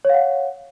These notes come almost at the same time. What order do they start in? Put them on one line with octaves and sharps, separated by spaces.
C#5 F5 F#5